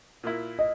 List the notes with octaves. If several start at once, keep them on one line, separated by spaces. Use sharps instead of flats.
A#2 A#3 E4
D#5